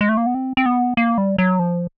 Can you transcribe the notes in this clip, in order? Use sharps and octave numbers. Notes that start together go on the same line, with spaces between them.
G#3
A3
A#3
B3
C4
C4
B3
A#3
G3
F#3
F3